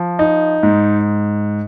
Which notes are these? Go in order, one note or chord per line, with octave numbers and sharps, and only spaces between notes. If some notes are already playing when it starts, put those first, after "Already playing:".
Already playing: F3
D#4
G#2